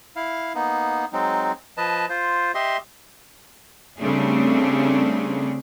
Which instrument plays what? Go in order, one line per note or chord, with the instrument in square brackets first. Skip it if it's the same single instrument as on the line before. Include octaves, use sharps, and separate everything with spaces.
[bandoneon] E4 F5
A#3 B3 D#4
F#3 G#3 C4 D#4
F3 B4 D#5 A5
F4 C5
G4 D#5 E5 C6
[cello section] C#3 G3 A3 C4 D4 G#4